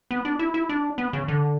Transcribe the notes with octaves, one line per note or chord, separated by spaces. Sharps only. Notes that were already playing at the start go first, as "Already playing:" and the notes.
B3
D4
E4
E4
D4
B3
C#3
D3